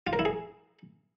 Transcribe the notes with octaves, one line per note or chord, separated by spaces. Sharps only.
F4
A#4
E4
G#4